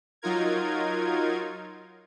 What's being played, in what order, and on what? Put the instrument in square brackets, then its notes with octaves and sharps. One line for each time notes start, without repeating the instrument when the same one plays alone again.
[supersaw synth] F#3 D#4 F4 A#4 G#6